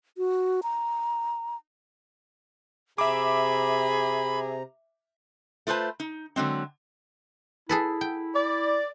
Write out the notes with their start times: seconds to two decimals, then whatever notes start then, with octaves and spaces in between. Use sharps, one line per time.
0.18 F#4
0.63 A#5
2.98 C3 G#4 E5 A#5 B5 D6
5.67 A3 F4 B4 C5 A5
6.00 D#4
6.36 D3 F#3 G#3 C4
7.69 E4 G#4 A4 B4
8.01 G5
8.35 D5